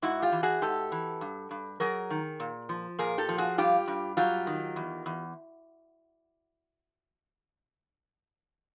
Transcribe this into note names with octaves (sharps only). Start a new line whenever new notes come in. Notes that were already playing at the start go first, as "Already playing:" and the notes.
G#2 E4 F#4
F4 G4
E3
F#4 G#4
G#2 G4 A4
E3
G2
G2
F#3 G#4 A#4
D#3
A#2
F3
A#2 G#4 A#4
G4 A4
F3
F#4 G#4
G2 F4 G4
G2
F#3 F4 G4
D#3
E2
E2